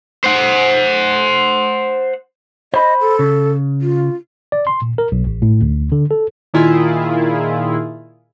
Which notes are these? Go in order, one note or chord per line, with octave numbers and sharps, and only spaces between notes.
C5 F#5
C5 D#5 B5
A4
C#3
F4
D5
C6
A#2
A#4
B1
A1
A2
D2
D3
A4
A#2 D#3 E4 F4 G#4